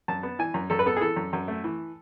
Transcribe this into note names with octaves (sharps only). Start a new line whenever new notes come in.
F#2 A5
B3
E3 G#5
F#2
F#2 A4
B4
B3 A4
G#4
E3 A4
F#2
F#2
A3
E3